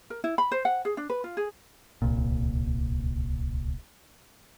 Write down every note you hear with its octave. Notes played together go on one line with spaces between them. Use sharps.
A#4
E4
B5
C5
F#5
G#4
D4
B4
F4
G#4
D1 C2 A#2